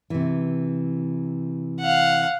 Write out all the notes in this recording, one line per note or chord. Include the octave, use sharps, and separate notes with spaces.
C3 E3
F5 F#5